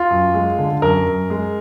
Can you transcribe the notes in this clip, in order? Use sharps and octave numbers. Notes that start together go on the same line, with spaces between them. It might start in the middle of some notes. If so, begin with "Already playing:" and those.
Already playing: F4
F#2
G#3
D3
F#2 A#4
F#2
G#3